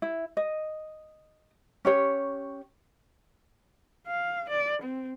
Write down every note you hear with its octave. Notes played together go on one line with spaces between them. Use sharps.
E4
D#5
C#4 G4 C#5
F5
D5
C4